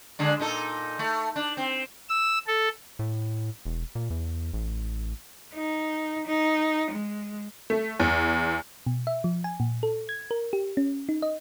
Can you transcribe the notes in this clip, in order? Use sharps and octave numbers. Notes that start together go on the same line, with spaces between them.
D3 G#3 D4
A#2 D#4 A4
A3
D4
C4
E6
A4
A2
E1
A#2
E2
A1
D#4
D#4
G#3
A3
E2
B2
E5
F3
G#5
A#2
A4
G#6
A#4
G4
C#4
D#4
D#5